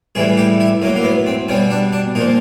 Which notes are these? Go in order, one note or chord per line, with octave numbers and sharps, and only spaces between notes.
A2 E3 G3 G#4
G4
E4
A2 F#3 A#3
A#3
B3
C4
B2 G3 C#4
D4
D4
A#2 F3 D#4